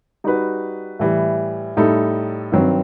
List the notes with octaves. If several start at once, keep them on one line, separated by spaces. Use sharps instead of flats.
G3 D#4 F#4 B4
A2 E3 G3
A2 G3 D#4 A4
G2 D#3 F#3 C4